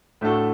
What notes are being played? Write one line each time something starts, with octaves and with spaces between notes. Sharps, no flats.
A2 A3 D4 F#4 A4